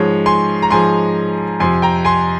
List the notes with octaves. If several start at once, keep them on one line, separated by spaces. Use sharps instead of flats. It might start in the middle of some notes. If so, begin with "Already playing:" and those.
Already playing: G#2 F3 G#3 C#5
G#5 C6
A#5
G#2 F3 G#3 G#5 C6
F2 C3 F3 G#5 C6
G5 A#5
G#5 C6